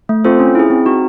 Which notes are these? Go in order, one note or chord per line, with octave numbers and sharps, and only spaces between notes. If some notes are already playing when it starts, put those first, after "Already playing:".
A3
C4 F4 A4 C5
C#4
E4 G#4
C4
D#4 F#4